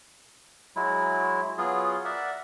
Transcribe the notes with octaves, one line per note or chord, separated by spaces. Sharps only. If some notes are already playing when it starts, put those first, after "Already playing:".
F#3 G#3 E4
F#3 B3 F4 G#4
A#4 D5 E5 F#5